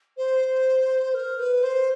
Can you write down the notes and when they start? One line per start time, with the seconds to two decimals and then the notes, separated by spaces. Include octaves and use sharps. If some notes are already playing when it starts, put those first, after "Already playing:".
0.17 C5
1.14 A#4
1.39 B4
1.63 C5